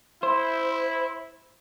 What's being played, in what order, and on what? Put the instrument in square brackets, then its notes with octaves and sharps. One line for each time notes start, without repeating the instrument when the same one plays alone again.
[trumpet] E4 [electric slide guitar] C5